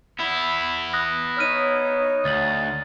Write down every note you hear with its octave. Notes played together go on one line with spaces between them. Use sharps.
B3 E4 B5
D#6 F#6 A#6
D#4 C#5 F6 D#7
D2 A6 F#7